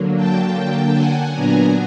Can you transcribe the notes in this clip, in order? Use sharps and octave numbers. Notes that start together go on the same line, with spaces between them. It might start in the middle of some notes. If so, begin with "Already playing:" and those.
Already playing: D3 F#3 A#3
G5 A5
F#5 G#5
A#2 F#3 B3 D4 G#5 A#5